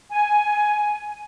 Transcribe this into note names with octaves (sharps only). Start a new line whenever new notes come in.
G#5